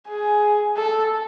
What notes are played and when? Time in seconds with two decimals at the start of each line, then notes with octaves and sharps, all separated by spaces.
0.08 G#4
0.77 A4